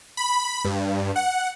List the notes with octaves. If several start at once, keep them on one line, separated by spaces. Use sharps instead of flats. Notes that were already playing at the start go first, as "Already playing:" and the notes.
B5
G2
F#5